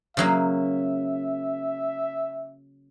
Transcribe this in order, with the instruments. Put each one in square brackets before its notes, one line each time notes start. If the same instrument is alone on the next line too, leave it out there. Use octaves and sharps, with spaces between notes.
[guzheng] C#3 F#3 A#3 [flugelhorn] E5